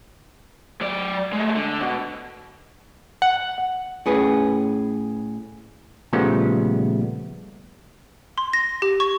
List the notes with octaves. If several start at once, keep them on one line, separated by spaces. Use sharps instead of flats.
F#3 D5
G#3 A3
D3
B2
F#5
A2 C#4 G#4 B4
A#2 C#3 F3 G3 A3 B3
C6
A#6
G4
C#6